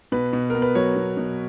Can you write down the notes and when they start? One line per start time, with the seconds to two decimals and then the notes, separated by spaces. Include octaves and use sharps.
0.12 B2 B4
0.33 B2
0.50 B3 A#4
0.62 B4
0.75 F#3 C#5
0.96 B2
1.17 B2